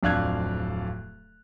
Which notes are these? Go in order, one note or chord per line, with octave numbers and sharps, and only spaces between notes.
D1 F2 D4 F5 F#6 G#6